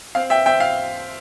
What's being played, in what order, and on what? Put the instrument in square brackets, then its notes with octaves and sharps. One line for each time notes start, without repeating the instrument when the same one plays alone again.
[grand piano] C4 F5
E5 G5
C4 E5 G5
F5